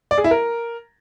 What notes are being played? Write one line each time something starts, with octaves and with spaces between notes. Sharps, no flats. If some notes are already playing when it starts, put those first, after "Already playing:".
D5
G#4
E4
A#4